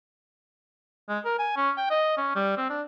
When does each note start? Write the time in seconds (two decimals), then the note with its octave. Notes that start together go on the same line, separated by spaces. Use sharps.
1.09 G#3
1.25 A#4
1.39 G#5
1.57 C#4
1.78 G5
1.90 D#5
2.18 C#4
2.36 G3
2.57 C4
2.70 D4